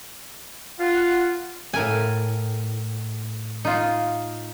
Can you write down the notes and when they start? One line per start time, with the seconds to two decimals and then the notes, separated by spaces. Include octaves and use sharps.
0.80 F4 F#5
1.73 A2 A#4 G#5
3.65 D#4 F4